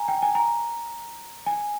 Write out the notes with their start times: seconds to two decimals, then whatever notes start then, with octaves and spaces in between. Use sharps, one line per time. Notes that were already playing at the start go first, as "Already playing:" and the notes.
Already playing: G#5 A#5
0.08 G5
0.22 G#5
0.35 A#5
1.46 G#5